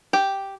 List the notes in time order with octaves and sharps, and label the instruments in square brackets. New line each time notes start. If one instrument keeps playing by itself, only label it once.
[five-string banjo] G4